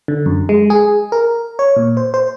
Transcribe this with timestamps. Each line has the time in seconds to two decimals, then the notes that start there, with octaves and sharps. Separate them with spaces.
0.08 D3
0.26 F#2
0.49 G#3
0.70 G#4
1.12 A#4
1.59 C#5
1.76 A#2
1.97 C5
2.14 C5